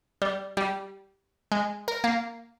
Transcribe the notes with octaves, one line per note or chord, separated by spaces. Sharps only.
G3
G3
G#3
A#4
A#3